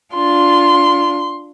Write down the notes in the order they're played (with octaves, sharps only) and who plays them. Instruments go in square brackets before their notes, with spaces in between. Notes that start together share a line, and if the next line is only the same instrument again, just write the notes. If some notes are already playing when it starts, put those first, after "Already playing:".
[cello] D4 F4 [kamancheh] C6